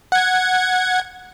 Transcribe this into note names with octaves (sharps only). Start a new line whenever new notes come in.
F#5 G#6